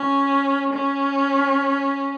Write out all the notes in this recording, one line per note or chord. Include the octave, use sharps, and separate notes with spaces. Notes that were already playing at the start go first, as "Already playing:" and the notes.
Already playing: C#4
C#4